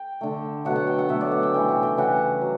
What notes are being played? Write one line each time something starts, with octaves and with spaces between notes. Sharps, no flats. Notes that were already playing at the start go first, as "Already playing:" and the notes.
Already playing: G5
D3 A3
B2 F#3 A3 F#5
F#5
G5
F#5
B2 F#3 A3 E5
D5
F#5
G5
C#3 E3 G3 G5
F#5
G5
C#3 E3 G3 F#5
F#3